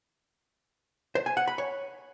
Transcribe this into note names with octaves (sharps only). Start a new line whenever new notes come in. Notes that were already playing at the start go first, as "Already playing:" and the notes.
C5
G#5
F#5
B5
C#5